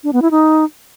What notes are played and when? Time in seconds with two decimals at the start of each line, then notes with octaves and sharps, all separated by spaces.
0.04 D4
0.13 B3
0.22 E4
0.31 D#4